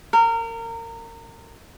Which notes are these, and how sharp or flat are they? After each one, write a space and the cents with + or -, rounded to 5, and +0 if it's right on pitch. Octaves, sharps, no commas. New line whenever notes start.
A#4 -25